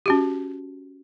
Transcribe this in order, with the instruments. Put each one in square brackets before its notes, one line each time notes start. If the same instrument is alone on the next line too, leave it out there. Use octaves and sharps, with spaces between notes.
[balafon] C#4 F#4 G4